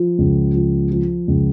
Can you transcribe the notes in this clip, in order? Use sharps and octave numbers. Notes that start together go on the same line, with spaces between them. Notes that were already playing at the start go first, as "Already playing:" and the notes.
Already playing: F3
C#2
F3
F3
C#2